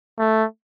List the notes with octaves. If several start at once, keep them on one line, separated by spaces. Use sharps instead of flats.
A3